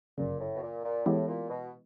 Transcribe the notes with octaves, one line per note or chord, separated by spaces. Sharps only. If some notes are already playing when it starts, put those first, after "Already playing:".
G1 F#2 A#2 C#3
A2
B2
A#2
A#2
A2 E3 G#3 B3 E4 G4
A#2
B2